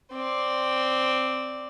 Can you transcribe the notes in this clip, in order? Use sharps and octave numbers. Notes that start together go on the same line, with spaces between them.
C4 D5